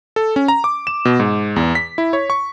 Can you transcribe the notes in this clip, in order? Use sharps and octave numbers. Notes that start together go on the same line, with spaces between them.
A4
C#4
A#5
D6
E7
B2
G#2
E2
B6
E4
C#5
C#6